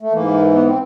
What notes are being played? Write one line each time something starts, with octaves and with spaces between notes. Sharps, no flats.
A3
G#2 E3 A#3
B3
C4